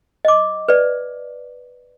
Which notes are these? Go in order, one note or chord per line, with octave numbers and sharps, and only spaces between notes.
D#5 D6
B4 D5